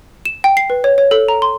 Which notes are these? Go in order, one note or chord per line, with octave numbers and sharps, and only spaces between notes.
E7
G5
C7
B4
C#5
C#5
A4
A#5
C6